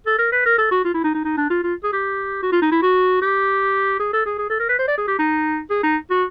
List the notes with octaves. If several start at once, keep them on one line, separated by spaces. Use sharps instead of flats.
A4
A#4
B4
A#4
A4
F#4
F4
E4
D#4
D#4
D#4
D4
F4
F4
G#4
G4
F#4
F4
D#4
E4
F#4
G4
G#4
A4
G#4
G#4
A4
A#4
B4
C5
D5
G#4
G4
D#4
G#4
D#4
F#4